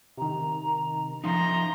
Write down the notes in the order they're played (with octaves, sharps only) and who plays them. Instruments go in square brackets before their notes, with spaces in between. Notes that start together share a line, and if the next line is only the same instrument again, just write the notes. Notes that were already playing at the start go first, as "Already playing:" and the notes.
[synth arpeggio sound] C3 D#3 [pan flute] A#5
[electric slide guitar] F3 D#4 [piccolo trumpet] A#5 [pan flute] C6